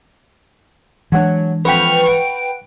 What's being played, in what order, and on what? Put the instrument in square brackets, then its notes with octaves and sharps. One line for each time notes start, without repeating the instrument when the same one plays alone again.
[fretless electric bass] E3 G#3 D4 [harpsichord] F#3 F#4 G#5
[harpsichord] F2 F#5 B5 [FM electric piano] B4 G5 [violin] C#6 F6
[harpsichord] F#5 [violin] D7